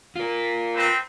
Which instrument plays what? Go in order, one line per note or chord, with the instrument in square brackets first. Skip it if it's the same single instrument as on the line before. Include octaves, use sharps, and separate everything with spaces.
[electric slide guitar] F4 A#4
[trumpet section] C4 D#4 B4